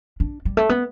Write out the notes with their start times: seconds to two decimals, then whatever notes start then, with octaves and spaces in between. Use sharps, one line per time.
0.20 D4
0.45 G3
0.57 A3
0.69 B3